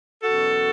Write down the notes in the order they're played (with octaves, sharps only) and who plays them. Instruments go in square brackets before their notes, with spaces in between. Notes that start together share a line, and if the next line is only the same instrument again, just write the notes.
[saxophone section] E2 B2 F#3 C#4 F#4 A4